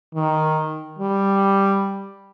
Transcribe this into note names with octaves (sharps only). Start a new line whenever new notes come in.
D#3
G3